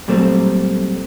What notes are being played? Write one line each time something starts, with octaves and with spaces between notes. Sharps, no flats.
A#2 F#3 G3 A3 C4